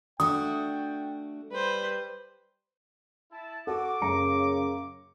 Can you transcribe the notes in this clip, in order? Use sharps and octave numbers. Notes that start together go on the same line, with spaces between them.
A3 D4 F#4 G5 D#6
G3 B4 C5
E4 A5
F#4 A4 D6
F#2 C#3 A#3 A#5 C#7